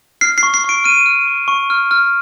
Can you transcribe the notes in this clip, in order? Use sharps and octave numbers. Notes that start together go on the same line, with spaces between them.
F6 C7
C7
C#6
C7
C#6 D7
F6 D#7
F6
C#6
C#6
F6
F6